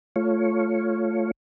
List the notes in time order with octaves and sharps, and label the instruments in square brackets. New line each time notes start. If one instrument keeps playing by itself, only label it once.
[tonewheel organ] A3 F4 C#5